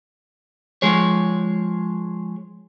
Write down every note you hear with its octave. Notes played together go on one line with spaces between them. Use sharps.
F3 G#3 G#4 C#5